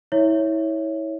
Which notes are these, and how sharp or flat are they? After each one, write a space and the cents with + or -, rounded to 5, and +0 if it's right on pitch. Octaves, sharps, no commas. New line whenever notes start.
E4 -30 C#5 +0 E5 +0